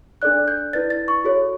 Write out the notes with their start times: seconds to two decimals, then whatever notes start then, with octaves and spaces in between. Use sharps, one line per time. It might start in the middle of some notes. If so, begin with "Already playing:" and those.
0.22 D4 A4 D5 F#6
0.48 G6
0.73 E4 B4 D5 A6
0.90 A6
1.08 C#6
1.24 F#4 A4 C#5